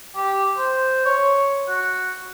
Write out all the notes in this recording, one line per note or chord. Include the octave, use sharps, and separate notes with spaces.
G4
C5
C#5
F#4